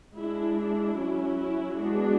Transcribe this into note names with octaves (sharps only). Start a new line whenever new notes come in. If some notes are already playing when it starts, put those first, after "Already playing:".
G#3 D4 E4
E4
F#3 C#4
E4
G#3 B3 D4 F#4